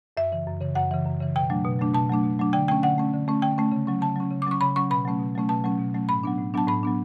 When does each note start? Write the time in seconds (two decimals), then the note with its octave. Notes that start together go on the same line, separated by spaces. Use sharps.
0.17 F#2 E5
0.32 C#3 E3
0.47 F#2
0.61 C#3 E3
0.75 F#2 F#5
0.91 C#3 E3
1.06 F#2
1.20 C#3 E3
1.35 B2 G5
1.50 F#3 A3 D4
1.64 B2
1.79 F#3 A3 D4
1.94 B2 A5
2.10 F#3 A3 D4
2.24 B2
2.39 F#3 A3 D4
2.53 D3 G5
2.68 A3 C#4 G5
2.83 D3 F#5
2.98 A3 C#4
3.13 D3
3.28 A3 C#4
3.42 D3 G5
3.58 A3 C#4
3.72 C#3
3.87 F#3 C#4
4.01 C#3 A5
4.16 F#3 C#4
4.31 C#3
4.42 D6
4.47 F#3 C#4 C#6
4.61 C#3 B5
4.76 F#3 C#4 C#6
4.90 B2 B5
5.05 F#3 A3 C#4
5.20 B2
5.35 F#3 A3 C#4
5.49 B2 A5
5.64 F#3 A3 C#4
5.79 B2
5.94 F#3 A3 C#4
6.09 A2 B5
6.23 F#3 B3 D4
6.38 A2
6.54 F#3 B3 D4 A5
6.67 A2 B5
6.83 F#3 B3 D4